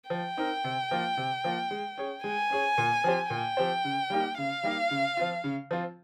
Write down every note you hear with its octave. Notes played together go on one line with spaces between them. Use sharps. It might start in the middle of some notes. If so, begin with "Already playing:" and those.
F3 G5
C4 D#4 A#4
C3
F3 A#3 F4
C3
F3 A#3 F4
G#3
C#4 G#4 C#5
G#3 G#5
C#4 G#4 C#5
A#2
F3 C4 G4 C5
A#2 G5
F3 C4 G4 C5
C#3
G3 A#3 D#4 G4
C#3 F5
G3 A#3 D#4 G4
C#3
F3 C4 F4
C#3
F3 C4 F4